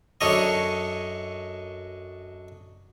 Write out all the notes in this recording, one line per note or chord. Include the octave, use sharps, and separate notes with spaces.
F#2 D4 A4 C#5 D#5